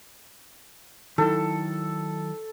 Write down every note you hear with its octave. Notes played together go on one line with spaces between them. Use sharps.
D#3 F#3 E4 A4